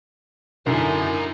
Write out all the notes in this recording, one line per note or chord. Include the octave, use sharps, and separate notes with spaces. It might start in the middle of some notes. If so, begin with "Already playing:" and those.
F#2 D3 D#4 E4 A#4 G#5